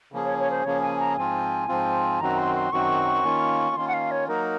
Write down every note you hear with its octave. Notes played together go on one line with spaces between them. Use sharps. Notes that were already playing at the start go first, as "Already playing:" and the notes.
C#3 F3 A#3 C#4 G#4
C#5
C#5
C5
C#3 F3 A#3 C#4 G#4 C#5
G#5
A#5
G#2 F3 C4 F4 G#5
G#2 F3 C4 F4
F#2 D#3 F#3 C4 F#4 A#5
C6
C6
F#2 D#3 F#3 C4 F#4 C#6
D#3 A#3 C#4 F4
D#3 A#3 C#4 F4 C6
F#5
F5
C#5
F#3 A#3 D#4 F#4 A#4